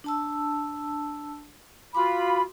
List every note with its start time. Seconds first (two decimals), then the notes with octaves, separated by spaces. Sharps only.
0.04 D4 A5 E6
1.95 F4 F#4 B5 C6 D6